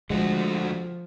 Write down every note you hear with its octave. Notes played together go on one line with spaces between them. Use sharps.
D3 F3 G#3 A3 F#4